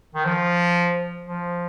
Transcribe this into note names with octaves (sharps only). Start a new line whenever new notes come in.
D#3
F3
F3